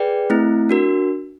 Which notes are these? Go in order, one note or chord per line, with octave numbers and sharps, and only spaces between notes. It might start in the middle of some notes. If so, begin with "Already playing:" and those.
Already playing: G#4 B4 D5 G5
A3 C4 E4
D4 F#4 A#4